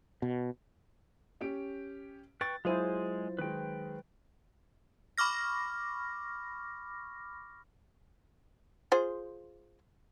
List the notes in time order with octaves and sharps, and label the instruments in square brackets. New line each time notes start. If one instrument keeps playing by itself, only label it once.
[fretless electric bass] B2
[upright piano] C#4 G4 D7
[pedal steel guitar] B4 G5 C#6 [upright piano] A6
[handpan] F#3 C5 [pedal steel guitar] G#3 G#4 G#5 [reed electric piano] E4 F4
[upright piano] D#3 G#3 [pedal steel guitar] B4 G5
[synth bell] B5 C#6 D6 F6 A#6
[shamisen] F4 G#4 C5